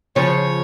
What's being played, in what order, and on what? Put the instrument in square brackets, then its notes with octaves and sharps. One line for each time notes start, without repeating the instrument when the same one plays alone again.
[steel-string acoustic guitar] C#3 F3 [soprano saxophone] C#5